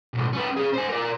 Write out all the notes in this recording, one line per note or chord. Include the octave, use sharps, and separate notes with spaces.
B1 A2
C#4 B4
C#4 G#4
C5 G#5
A#4 D5